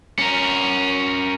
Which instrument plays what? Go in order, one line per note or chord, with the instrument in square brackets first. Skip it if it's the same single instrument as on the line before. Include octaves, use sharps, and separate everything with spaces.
[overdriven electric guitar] C#4 A#4